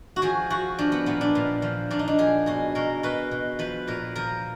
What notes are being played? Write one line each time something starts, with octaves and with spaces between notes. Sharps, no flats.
F#4
F3 G#4
F3 F#4
F3 D4
B3
A#2 B3
D4
A#2
F3
A#2 D4
D#4
D4
F3 G#4
B2 G#4
B2 A#4
B2 B4
B2
F3 B4
A#2 A#4
F3 A#4